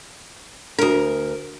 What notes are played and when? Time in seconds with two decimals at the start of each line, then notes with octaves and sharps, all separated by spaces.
0.79 D2 D4 F#4 A#4